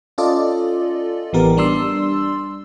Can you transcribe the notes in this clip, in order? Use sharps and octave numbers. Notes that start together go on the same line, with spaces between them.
C#4 F4 A4 D5 D#5
A1 E3 B3 G4 A#4
G3 D4 D5 C6 E6